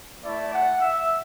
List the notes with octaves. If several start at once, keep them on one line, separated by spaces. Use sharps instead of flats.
A3 E4 D5
F#5
E5